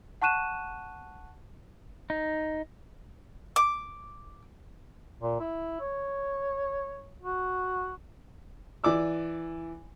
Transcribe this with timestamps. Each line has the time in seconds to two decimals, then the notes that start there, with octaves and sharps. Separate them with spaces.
0.22 F#5 A5 C#6 F#6 D#7 E7
2.10 D#4
3.56 D6
5.21 A#2
5.40 E4
5.80 C#5
7.22 F#4
8.84 E3 D5 D6 E6